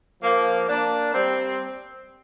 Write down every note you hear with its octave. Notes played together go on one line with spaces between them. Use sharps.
F3 A#3
A#3 D4
G3 C4